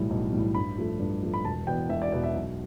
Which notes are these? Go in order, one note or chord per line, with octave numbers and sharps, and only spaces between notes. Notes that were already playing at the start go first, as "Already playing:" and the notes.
Already playing: B1 A2 E3 G3
B1
A2 E3 G3
G2 B5
F3 A3
G2
F3 A3
B5
E1 A5
E2 B2 B3 G5
E1 E5
D5
E2 B2 B3 D5
E5
B1